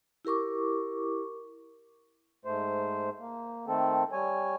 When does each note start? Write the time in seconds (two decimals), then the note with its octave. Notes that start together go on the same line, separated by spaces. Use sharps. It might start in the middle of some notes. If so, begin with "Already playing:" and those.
0.25 E4 G4 A#4 C#6 D6
2.45 G#2 A3 C5
3.19 A#3
3.67 D#3 A3 C4 A4
4.12 G3 C#5 G#5